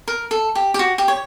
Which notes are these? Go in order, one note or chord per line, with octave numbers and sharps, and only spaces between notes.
A#4
A4
G4
G4
F#4
G4
C#5